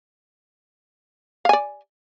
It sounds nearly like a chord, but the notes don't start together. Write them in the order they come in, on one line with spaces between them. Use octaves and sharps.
F5 G#5 D5